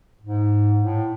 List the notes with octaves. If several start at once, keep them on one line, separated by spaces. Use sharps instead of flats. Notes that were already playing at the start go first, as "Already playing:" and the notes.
G#2
A2